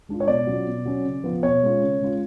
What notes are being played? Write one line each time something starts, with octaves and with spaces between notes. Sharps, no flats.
G#3 D4 F4
C#5
B2 D5
F#3 C#4 F4
B2
F#3 C#4
C#3
F3 B3 F4
B2 C#5
G#3 C#4 F4
C#3
G#3 C#4 F4